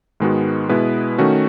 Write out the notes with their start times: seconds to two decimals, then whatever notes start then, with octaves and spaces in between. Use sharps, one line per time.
0.20 G#2 D#3 G#3 B3 F#4
0.69 B2 G#3 B3 E4 B4
1.18 D#3 A3 C#4 F#4